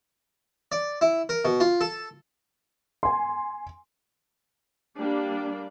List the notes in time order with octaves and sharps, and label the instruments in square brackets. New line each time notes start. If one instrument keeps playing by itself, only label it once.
[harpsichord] D5
E4
A#4
B2
F4
A4
[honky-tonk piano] G#5 C6
[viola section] G3 A#3 D4 D5